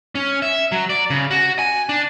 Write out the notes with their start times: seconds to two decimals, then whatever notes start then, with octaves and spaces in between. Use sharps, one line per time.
0.15 C#4
0.42 E5
0.72 F#3
0.90 D5
1.10 C#3
1.31 F#4
1.59 G#5
1.89 D4